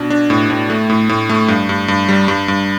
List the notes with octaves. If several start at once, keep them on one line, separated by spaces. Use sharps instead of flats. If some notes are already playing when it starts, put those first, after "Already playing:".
Already playing: B2 D4
D4
A2
A2
A3
A2
A2
A3
G2
G2
G2
G3
G2
G2